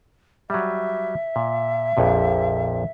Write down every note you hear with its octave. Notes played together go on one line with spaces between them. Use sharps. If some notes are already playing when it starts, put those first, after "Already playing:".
F#3 G3 E5
A#2
A#1 F2 A#2